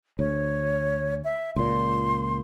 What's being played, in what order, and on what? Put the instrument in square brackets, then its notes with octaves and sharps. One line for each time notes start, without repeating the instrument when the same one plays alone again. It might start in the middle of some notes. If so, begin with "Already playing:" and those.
[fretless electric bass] D2 [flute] C#5
[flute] E5
[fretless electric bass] C#2 A#2 [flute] C6